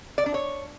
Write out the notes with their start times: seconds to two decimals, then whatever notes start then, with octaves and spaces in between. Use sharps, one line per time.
0.18 D5
0.26 D4
0.34 C#5